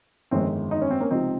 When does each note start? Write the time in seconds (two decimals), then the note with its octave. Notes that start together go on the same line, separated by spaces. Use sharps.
0.31 G1 F2 D#3 G#3 C4
0.71 D#4
0.81 C#4
0.91 C4
1.00 A#3 C#4
1.11 C#2 C3 F3 C4 D#4